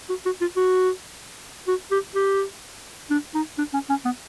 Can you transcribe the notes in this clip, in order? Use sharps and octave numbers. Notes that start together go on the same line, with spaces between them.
F#4
F#4
F4
F#4
F#4
G4
G4
D4
D#4
D4
C#4
C#4
B3